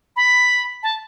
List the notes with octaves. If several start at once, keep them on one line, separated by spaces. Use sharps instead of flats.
B5
A5